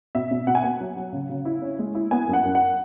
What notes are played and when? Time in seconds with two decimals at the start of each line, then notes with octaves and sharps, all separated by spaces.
0.15 B2 E5
0.31 B2
0.47 B2 F#5
0.55 G#5
0.63 B3 F#5
0.80 F#3
0.97 F#3
1.13 C#3
1.29 C#3
1.45 E4
1.62 C#4
1.79 G#3
1.95 E4
2.11 B3 G#5
2.28 F#2
2.33 F#5
2.44 F#2
2.55 F#5